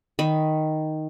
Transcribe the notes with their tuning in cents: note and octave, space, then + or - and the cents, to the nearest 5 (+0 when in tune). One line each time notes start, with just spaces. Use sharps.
D#3 +0 B5 +0